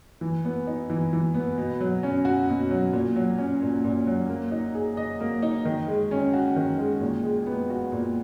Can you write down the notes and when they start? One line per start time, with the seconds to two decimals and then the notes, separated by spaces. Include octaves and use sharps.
0.21 E3
0.45 B3
0.67 D#4
0.90 E3
1.13 E3
1.34 B3
1.58 B2
1.80 F#3
2.03 C#4
2.25 F#4
2.49 B2
2.71 F#3
2.93 A#2
3.16 F#3
3.38 C#4
3.62 A#2
3.84 A#2
4.07 F#3
4.29 A#3
4.51 D#4
4.75 G#4
4.97 D#5
5.20 A#3
5.42 D#4
5.65 D#3
5.88 G#3
6.11 C#4
6.33 F#4
6.56 D#3
6.78 G#3
7.01 A#2
7.23 G#3
7.46 B3
7.70 F#4
7.92 A#2